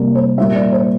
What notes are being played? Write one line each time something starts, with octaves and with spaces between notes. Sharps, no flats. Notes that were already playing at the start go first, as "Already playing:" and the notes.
Already playing: C3 G3 A#3 A#4 D5
C5
A#2 G3 A#3 E5
D5
C5